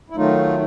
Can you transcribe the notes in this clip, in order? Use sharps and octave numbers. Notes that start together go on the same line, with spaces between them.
E4
D#3 F#3 A3 D#4 F4